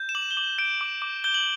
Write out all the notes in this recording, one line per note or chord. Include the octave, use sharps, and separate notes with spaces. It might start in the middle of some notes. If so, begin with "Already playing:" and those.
Already playing: G6
E7
D6 F#7
G7
D6 F#7
G6 D7
D6
D6
G6 G7
F#7